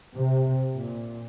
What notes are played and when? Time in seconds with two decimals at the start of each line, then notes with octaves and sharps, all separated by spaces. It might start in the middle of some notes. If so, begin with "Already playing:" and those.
0.16 C3
0.74 A#2